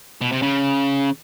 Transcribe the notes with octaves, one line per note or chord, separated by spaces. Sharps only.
B2
C3
C#3